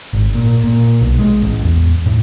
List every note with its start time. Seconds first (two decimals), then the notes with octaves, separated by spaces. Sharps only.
0.13 G#1
0.35 A#2
0.64 A#2
1.01 B1
1.19 G#3
1.42 A1
1.63 E2
2.06 A2